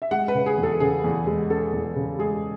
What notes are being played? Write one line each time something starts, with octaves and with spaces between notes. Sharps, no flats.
E5
G#3 F#5
B4
C#3
G#4
E2
A4
C#3 G#4
E2
G#3
C#4 A4
E2
C#3
G#3 G#4